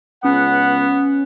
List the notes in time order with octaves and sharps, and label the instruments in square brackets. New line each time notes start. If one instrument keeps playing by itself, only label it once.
[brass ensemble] C#2 F#5 [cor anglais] B3 [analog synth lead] C#4